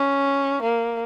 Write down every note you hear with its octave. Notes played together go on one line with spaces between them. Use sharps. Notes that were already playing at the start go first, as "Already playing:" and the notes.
Already playing: C#4
A#3